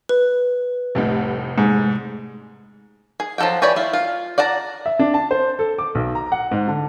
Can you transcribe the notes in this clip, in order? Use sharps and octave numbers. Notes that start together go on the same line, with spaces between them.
B4
F1 C2 A2
G#2
G#4
F3 F#3 A4 F#5 G5
E3 G4 C#5 D5 G#5
E4 F4
F4
D5 F#5 A5 A#5
E5
D4
A5
C5
A4
D6
B1
A#5
F#5
G#2
D3